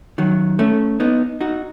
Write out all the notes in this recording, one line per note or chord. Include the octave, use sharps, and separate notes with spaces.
D#3 F#3
A3 C#4
B3 D#4
D#4 F#4